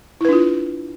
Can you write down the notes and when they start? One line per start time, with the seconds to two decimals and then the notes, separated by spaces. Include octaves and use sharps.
0.21 E4
0.25 B4
0.29 D4
0.33 F4